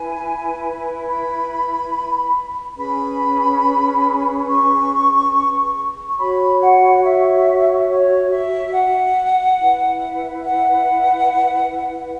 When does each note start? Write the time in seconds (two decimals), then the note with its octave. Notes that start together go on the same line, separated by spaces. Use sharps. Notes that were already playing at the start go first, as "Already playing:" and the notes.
Already playing: E4 B4 G#5
1.06 B5
2.76 C#4 G#4 B4 B5
4.47 C#6
6.06 C#6
6.17 F#4 C#5 B5
6.60 F#5
7.02 E5
7.88 C#5
8.30 E5
8.73 F#5
9.58 E4 B4
10.43 F#5